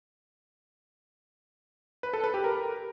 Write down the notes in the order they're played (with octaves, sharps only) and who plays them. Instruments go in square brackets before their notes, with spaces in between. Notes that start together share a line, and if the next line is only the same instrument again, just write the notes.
[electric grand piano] B4
A4
B4
G4
A#4